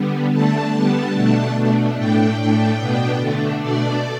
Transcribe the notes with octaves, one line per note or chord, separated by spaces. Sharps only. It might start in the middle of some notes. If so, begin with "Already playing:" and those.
Already playing: D3 G3 B3
D3 A3 D4 A5
D3 G3 B3 D4
B2 A3 D4
B2 A3 D4
A2 A3 D4 G5
A2 A3 D4
B2 B3 D4
D3 A3 D4
B2 A3 D4 D5